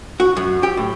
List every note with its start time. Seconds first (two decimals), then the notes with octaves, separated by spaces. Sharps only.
0.20 F#4
0.37 F#2
0.63 G4
0.77 A2